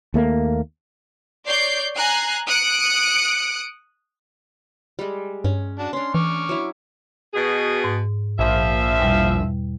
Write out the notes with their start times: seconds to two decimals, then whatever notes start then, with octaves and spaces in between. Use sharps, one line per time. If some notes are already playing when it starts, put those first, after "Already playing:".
0.14 D#2 A3 A#3
1.45 C#5 D5 G6 C7
1.96 G#5 A#5 F#6 C7
2.48 D#6 F#6 C#7 D7
4.99 G3 G#3
5.44 G2 C#4
5.79 D4 F#4 A5
5.93 C#4 D4 C6
6.14 E3 C#6 D6 F6
6.49 F#3 E4
7.34 B2 G#4
7.84 G#2
8.39 A#1 F3 E5
8.99 E2 B2 G3